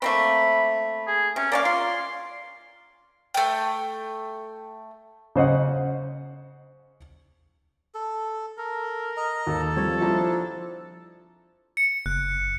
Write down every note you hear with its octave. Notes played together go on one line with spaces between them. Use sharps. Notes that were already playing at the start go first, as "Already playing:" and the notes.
A3 A#3 C4 B5
G#4
C3 C#4
A#3 C#4 D5 F5
F4 C6
A3 G5
C#3 C5 D#5 F#5
A4
A4 A#4
D#5 A#5
D#2 A4
F3 G3 C4 C#5
F3 D4 E4 C5 A#5
C#7
F#1 F#6